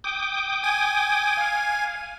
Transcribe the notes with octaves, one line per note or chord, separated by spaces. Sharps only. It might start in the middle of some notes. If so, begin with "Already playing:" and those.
G5 D6 D#6
G#5 G#6
F5